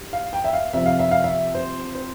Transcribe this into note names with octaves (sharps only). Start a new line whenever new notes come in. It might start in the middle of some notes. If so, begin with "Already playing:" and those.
Already playing: G2
F5
G5
E5
F5
C3 F3 C4 E5
F5
E5
F5
E5
C5
C5